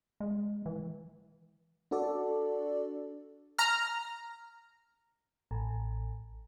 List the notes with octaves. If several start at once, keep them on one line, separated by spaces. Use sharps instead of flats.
G#3
E3
D4 F#4 A4 D5
A#5 F6
A1